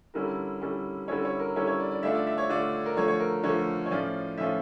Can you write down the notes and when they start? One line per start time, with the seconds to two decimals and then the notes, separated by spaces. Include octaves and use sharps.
0.14 D3 G3 C#4 E4 A#4
0.61 D3 G3 C#4 E4
1.08 D3 G3 C#4 E4 C#5
1.25 C#5
1.40 A#4
1.56 D3 G3 C#4 E4 C#5
1.67 C#5
1.80 D5
1.91 D5
2.03 D3 A3 D4 F4 E5
2.15 D5
2.27 E5
2.38 C#5
2.49 D3 A3 D4 F4 D5
2.86 A#4
2.97 D3 F3 A3 C#5
3.08 C#5
3.20 A#4
3.43 D3 F3 A3 C#5
3.86 C#5
3.91 A2 F3 C#4 F4 D5
4.38 A2 F3 C#4 F4 E5